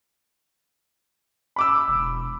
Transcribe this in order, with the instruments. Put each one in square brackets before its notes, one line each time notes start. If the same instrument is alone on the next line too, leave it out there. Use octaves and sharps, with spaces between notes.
[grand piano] B5 D6 E6
[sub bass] E1